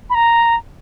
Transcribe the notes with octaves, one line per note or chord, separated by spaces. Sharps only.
B5
A#5